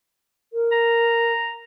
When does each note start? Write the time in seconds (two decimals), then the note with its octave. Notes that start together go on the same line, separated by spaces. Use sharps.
0.53 A#4
0.72 A#5